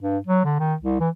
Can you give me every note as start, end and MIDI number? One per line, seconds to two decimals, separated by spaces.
0.02 0.18 43
0.27 0.45 54
0.45 0.56 50
0.60 0.75 51
0.82 0.99 36
1.00 1.09 52